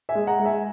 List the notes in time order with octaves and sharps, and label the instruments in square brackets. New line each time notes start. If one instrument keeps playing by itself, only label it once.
[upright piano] E5 G#5
G#3
F#5 A#5
G#3
E5 G#5